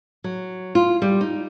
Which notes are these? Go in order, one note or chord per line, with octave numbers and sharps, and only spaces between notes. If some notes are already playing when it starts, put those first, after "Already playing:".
F#3
F4
G3
D#4